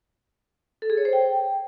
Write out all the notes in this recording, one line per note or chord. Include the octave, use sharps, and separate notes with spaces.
A4
G#4
C#5
C5
G5